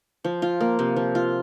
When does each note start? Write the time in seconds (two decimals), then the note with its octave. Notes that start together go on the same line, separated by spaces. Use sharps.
0.24 F3
0.42 F4
0.60 A#3
0.79 C3
0.96 F3
1.15 F4